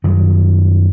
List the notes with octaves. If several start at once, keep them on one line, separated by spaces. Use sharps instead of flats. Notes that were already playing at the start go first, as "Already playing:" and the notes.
F#2 D#3 F#3 G3